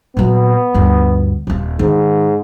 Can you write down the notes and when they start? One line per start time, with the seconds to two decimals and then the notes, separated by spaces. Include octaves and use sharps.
0.17 A#2 F#3 B3
0.74 D2 G2
1.47 D#1 F4
1.79 G#2 D#3